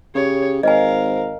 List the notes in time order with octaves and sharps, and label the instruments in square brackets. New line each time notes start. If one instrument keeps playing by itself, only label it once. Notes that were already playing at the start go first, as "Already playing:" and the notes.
[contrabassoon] C#3 [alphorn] G4 [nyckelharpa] C#5
[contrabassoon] G#1 [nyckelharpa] A#4 F5 [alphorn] C5 [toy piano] D#5 G#5